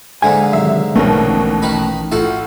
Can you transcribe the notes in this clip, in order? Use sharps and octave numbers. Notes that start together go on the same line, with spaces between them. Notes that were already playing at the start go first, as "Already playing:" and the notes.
G#2 D3 A#3 E5 G#5
C3 D#3 F#3 E5
A#1 D#2 B2 E3 A3 C#4 A#4
D#3 D#4 B4
A2 F4 F#4 A4